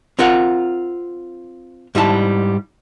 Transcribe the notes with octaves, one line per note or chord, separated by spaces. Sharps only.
C4 F4 A#4 F#5
G#2 G3 E4 A5